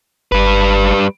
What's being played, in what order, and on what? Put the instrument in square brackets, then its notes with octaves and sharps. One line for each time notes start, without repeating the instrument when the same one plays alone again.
[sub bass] G1 [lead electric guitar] G3 B4